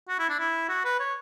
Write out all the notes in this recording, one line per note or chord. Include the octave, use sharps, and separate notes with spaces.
F#4
E4
D4
E4
F#4
B4
C#5